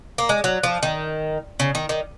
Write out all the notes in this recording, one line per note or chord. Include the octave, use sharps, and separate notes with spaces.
A#3
G#3
F#3
F3
D#3
C#3
D#3
D#3